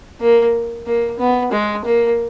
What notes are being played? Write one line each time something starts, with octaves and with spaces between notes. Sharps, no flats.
A#3
A#3
B3
G#3
A#3